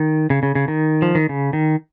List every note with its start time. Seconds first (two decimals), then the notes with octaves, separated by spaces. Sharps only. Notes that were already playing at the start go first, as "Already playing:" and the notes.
Already playing: D#3
0.30 C#3
0.43 C#3
0.55 C#3
0.68 D#3
1.02 F3
1.15 D#3
1.29 C#3
1.53 D#3